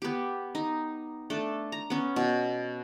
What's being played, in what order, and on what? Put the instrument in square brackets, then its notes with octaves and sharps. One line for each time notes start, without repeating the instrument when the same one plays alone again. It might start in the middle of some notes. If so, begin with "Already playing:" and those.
[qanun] B3 G4
D#4
A3 D4 A4
A#5
B3 C#4
B2